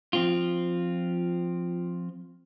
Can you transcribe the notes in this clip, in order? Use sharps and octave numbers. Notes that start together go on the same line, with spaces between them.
F3 C4 F4